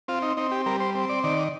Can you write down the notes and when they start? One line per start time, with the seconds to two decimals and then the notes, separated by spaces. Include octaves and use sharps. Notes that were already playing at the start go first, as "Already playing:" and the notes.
0.08 C4 F4
0.22 D#4
0.37 C4 D#4
0.51 G4
0.66 G3 A#4
0.80 C5
0.95 C4
1.09 D5
1.24 D#3 D5